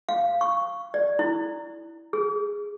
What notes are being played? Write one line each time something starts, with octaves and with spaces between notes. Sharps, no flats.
F5
C#6
D5
E4
G#4